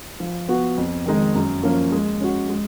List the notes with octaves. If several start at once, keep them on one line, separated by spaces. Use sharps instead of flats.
F3
B3 F#4
F2
D#3 G#3 D#4
F#2
F3 A#3 C#4
G#3
C#4 F#4
G#3